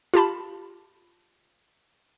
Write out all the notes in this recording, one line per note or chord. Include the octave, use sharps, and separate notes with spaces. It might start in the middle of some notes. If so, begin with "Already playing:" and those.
F4 G4 A5 B5